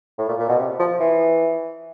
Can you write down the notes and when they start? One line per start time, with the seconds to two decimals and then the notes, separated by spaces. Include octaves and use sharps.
0.18 A2
0.29 A#2
0.39 A#2
0.49 B2
0.59 C3
0.79 F3
1.00 E3